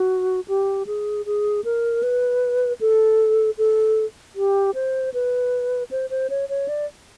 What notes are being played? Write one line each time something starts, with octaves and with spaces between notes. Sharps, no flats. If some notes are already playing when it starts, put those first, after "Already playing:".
Already playing: F#4
G4
G#4
G#4
A#4
B4
A4
A4
G4
C5
B4
C5
C5
C#5
C#5
D5